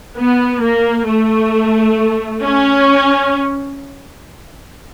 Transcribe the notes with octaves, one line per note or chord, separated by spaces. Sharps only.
B3
A#3
A3
C#4